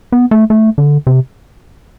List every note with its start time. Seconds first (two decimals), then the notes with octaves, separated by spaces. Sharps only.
0.12 B3
0.31 A3
0.50 A3
0.78 D3
1.07 C3